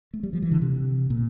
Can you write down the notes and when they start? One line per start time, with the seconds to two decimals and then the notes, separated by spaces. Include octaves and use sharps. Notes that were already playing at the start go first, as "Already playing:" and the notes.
0.14 A3
0.23 G3
0.33 F3
0.42 E3
0.51 D3
0.62 C3
1.10 A#2